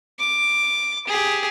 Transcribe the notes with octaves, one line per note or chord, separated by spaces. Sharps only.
D6
G4 G#4